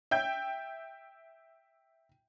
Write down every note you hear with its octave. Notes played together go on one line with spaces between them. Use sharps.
E5 G5 G6